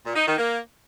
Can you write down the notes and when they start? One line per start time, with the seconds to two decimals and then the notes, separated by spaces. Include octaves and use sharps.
0.04 A#2
0.15 D#4
0.27 D#3
0.38 A#3